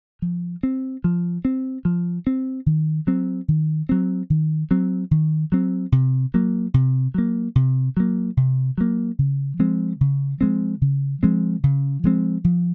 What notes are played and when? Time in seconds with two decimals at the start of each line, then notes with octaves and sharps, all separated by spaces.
0.22 F3
0.63 C4
1.04 F3
1.45 C4
1.85 F3
2.27 C4
2.66 D#3
3.07 F#3 C4
3.48 D#3
3.89 F#3 C4
4.30 D#3
4.71 F#3 C4
5.11 D#3
5.52 F#3 C4
5.92 C3
6.34 F#3 A#3
6.74 C3
7.14 F#3 A#3
7.55 C3
7.97 F#3 A#3
8.37 C3
8.78 F#3 A#3
9.19 C#3
9.59 F3 G#3 C4
10.01 C#3
10.41 F3 G#3 C4
10.82 C#3
11.23 F3 G#3 C4
11.63 C#3
12.04 F3 G#3 C4
12.44 F3